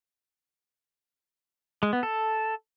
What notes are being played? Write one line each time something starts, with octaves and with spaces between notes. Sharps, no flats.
G#3
B3
A4